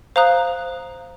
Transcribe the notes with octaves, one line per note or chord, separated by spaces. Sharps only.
C5 F5 A#5 D#6 F#6